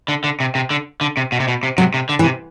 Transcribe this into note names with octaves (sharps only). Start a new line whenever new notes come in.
D3
D3
C3
C3
D3
D3
C3
B2
C3
B2
C3
C3 F#3
C3
D3
E3
C3